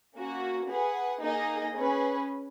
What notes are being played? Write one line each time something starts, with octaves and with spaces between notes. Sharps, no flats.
A#3 C#4 F#4
G#4 B4 F#5
A#3 D#4 G#4 D#5
C#4 G#4 B4